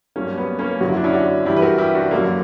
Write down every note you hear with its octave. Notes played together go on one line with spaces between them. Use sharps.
G2 F#3 A#3 C#4
B3
A#3 C#4
F#2 D3 F#3 F#4
E4
D4
C#4 E4
D4 F#4
G2 E3 E4 G4
B4
F#4 A#4
E4 G4
D4 F#4
F#2 D3 F#3 A#3